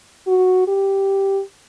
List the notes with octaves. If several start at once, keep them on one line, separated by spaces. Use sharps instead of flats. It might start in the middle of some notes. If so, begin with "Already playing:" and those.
F#4
G4